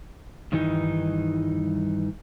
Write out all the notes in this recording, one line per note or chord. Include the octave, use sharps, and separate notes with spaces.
G2 D#3 E3 G3 D#4